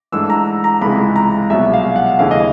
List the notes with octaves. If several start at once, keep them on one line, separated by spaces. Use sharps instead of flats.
G#2 E3 A3 D4 E6
A#5
A#5
C#2 C3 E3 G#3 B5
A#5
C2 B2 F#3 E5
F5
F#5
D#2 C#3 E3 A3 C#4 F5
D#5